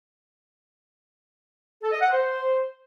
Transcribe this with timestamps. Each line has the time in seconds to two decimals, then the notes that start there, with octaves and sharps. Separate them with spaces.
1.82 A4
1.92 D#5
2.01 F#5
2.11 C5